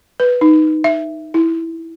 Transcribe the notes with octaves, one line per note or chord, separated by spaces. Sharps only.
B4
D#4
E5
E4